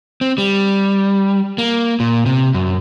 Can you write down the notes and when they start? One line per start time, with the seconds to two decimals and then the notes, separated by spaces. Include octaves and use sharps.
0.21 C4
0.38 G3
1.58 A#3
2.00 A#2
2.26 C3
2.54 F#2